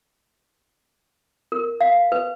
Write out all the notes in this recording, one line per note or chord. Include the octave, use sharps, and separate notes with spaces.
A#4
F5
B4